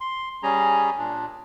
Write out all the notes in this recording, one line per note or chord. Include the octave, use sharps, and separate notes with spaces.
C6
G3 C#4 G#4 A#5
A#2 D4